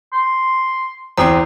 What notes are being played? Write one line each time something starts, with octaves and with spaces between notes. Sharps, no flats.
C6
E2 C4 A#5 D#6 C7